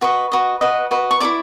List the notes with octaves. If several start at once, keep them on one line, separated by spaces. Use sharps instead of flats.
F#4 B4 D#5 C#6
F#4 B4 D#5
F#4 B4 D#5
F#4 B4 D#5
C#6
E4 A4 D5 D6